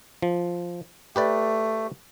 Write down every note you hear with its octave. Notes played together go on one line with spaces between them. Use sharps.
F3
A3 G4 B4 D5